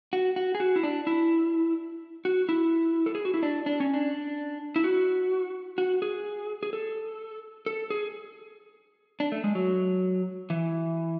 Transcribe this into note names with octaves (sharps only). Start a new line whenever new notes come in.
F#4
F#4
G#4
F#4
E4
D4
E4
F#4
E4
A4
G#4
F#4
E4
D4
D4
C#4
D4
E4
F#4
F#4
G#4
G#4
A4
A4
G#4
D4
A3
G#3
F#3
E3